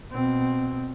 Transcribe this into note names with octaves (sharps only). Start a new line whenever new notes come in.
B2 C4